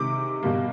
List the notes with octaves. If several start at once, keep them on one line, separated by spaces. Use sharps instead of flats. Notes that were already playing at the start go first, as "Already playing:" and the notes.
Already playing: C3 D#3 G#3 D6
B2 G3 A#3